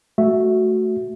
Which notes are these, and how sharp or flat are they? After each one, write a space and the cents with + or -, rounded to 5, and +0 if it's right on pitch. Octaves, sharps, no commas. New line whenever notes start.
A3 +0 F#4 +0 E5 +0